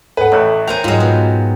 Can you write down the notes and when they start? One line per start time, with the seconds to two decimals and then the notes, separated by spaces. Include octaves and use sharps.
0.17 A4 B4 F#5
0.32 A1 C#5 E5 F#6
0.68 A#4 C5 G5 G#5 F7
0.84 G#2 F#3 F4 D#5
1.00 B2